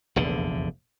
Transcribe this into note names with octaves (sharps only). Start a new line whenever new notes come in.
F1 A#1 E2 D3